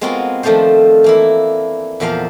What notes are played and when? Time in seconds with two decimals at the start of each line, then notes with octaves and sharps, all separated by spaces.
0.01 G#3 B3 C4 F4 F#4 A#4
0.43 D#3 F3 A3 D4 F4 C5
1.04 E3 A#3 E4
2.00 E2 A#2 F3 A#4 C5 F5